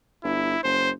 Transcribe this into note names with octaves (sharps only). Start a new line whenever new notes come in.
G1 E4
F#1 C5